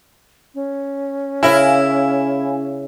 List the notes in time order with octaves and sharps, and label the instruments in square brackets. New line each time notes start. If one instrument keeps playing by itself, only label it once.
[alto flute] C#4
[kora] C#3 A#4 [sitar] E4 [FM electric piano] F5 G#5